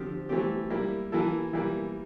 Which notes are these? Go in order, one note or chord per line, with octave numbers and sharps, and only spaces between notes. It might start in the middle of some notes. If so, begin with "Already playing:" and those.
Already playing: D3 F3 C4 G4
E3 A3 C4 G4
G3 A#3 E4
E3 A#3 E4 A4
E3 G3 A#3